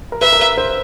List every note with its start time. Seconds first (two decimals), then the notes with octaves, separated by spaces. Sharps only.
0.12 A#4
0.21 B4 E5
0.32 A#4
0.40 B4
0.57 C5